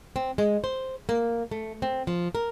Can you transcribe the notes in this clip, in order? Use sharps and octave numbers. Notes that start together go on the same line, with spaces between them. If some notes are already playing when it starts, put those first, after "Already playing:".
C4
G#3
C5
A#3
A3
C4
F3
A#4